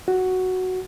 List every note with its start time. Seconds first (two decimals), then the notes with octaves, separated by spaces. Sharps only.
0.08 F#4